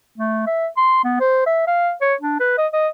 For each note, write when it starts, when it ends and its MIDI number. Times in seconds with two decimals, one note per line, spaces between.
0.18 0.44 57
0.47 0.67 76
0.77 1.01 84
1.04 1.20 59
1.20 1.42 72
1.46 1.65 76
1.67 1.92 77
2.01 2.15 73
2.21 2.39 62
2.40 2.54 71
2.58 2.67 75
2.73 2.88 75